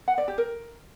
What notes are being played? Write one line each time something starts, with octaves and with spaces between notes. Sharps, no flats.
F#5
D5
G4
A#4